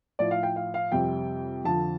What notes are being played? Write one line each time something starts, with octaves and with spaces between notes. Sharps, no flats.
A2 F3 D5
F5
G5
F5
F5
F2 C3 G3 G5
F2 D3 F3 A5